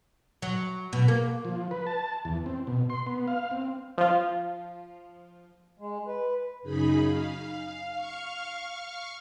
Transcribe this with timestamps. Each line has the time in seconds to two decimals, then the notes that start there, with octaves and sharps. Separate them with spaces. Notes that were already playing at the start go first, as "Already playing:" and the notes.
0.42 F#3
0.93 B2
1.08 A#3
1.45 F3
1.71 B4
1.87 A5
2.25 E2
2.46 C4
2.67 B2
2.90 C6
3.07 B3
3.28 F5
3.51 C4
3.98 F3 F4
5.79 G#3
6.07 B4
6.62 F#2 C#3 D#4 G#4 B5
7.05 F5
7.93 F5 C#6 F6